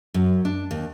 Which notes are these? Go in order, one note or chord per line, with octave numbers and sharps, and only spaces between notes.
F#2
D4
D#2